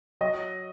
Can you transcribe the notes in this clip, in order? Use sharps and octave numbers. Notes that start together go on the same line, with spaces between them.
F#3 D#5